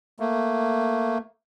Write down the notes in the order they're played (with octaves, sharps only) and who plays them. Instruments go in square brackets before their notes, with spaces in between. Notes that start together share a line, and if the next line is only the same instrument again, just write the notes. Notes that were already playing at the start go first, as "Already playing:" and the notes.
[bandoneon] A3 A#3